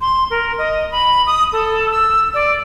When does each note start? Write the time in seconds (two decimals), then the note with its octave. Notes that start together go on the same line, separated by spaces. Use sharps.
0.01 C6
0.30 A#4
0.58 D#5
0.92 B5
1.26 D#6
1.52 A4
1.91 E6
2.34 D5